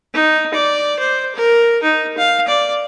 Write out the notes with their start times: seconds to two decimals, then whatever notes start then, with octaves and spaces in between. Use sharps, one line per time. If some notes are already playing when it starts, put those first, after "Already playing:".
0.14 D#4
0.54 D5
0.99 C5
1.36 A#4
1.83 D#4
2.18 F5
2.48 D5